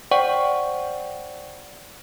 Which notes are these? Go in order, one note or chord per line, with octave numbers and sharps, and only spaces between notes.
C5 D5 F#5 G5 C#6